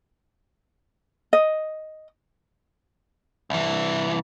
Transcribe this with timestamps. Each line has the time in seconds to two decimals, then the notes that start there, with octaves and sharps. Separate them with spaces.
1.33 D#5
3.50 C2 E3